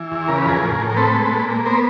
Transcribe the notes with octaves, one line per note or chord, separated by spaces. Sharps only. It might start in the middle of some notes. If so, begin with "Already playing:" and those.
Already playing: E3
E2
C#3 A#4
B4
F2 G#4 A#4
A2
A2
A#4
C4 A4 B4
G#3
A#2
A#3
B3 A#4 C5